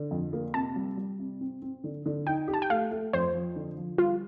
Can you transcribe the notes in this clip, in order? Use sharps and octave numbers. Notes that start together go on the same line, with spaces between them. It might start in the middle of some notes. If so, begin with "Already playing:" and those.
Already playing: D3
F2
A#3
C3 A5
G3
G3
C3
C4
C4
D3
D3
D#4 G5
G4
A5
G5
A3 F5
A3
F2 C5
F3
D3
F3
G3 F4